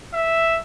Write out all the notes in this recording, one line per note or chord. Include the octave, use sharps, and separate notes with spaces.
E5